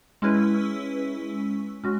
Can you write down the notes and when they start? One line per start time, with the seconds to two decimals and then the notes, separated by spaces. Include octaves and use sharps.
0.22 G#3 C#4 E4 B4
1.84 G#3 C#4 F#4